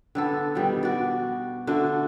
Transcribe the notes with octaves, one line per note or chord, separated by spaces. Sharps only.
D3 B3 A4
B2 D#3 G3
F#4 D5
D3 A3 F#4